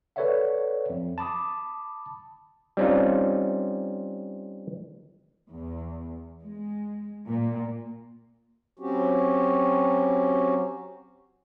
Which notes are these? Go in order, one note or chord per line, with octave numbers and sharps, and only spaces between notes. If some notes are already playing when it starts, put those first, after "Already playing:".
A4 B4 C#5 D5 E5 F#5
F2
A5 B5 D6 D#6
G3 C4 C#4 D#4 F4
E2
G#3
A#2
F#3 C4 C#4 F#4 G4